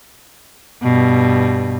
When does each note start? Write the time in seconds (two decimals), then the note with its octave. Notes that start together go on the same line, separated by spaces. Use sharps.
0.82 G2 B2